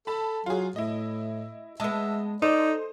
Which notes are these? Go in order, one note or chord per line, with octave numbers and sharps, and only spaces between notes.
A4 A5 B5
F#3 F4 G#4
A2 E4 D#5
G#3 B3 D#5 E5 A5
D#4 A4 C5 D5